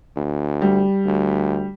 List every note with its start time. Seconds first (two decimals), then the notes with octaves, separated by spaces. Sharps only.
0.16 D2
0.62 G3
1.05 D2